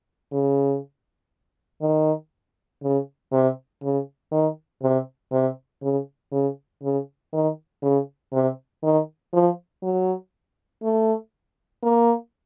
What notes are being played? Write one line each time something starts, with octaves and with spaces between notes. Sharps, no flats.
C#3
D#3
C#3
C3
C#3
D#3
C3
C3
C#3
C#3
C#3
D#3
C#3
C3
D#3
F3
F#3
A3
A#3